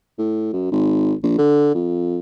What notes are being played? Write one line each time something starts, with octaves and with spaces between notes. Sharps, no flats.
A2
F#2
G#1
A#1
D3
F2